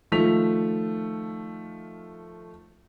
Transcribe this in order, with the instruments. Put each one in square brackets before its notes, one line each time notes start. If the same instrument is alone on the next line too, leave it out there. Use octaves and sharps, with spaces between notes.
[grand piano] D#3 F3 A3 B6 F7